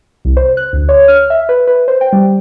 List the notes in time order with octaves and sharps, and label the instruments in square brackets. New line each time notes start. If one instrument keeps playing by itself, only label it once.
[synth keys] C2
C5
F#6
D2
C#5
F6
E5
B4
B4
C5
G5
G3